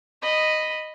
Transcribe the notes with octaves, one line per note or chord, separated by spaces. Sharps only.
D#5 B5